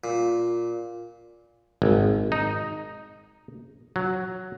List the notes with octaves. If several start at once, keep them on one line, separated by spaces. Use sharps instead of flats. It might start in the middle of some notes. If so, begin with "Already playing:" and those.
A#2
G#1
D#4
F#3